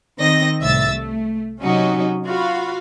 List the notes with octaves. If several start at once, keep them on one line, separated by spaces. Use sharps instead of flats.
D#3 C4 D#5 A#6
C2 A2 E5 E6 A6
A3
C3 F#3 C#4 D#4 F#4
F4 F#4 F5 B5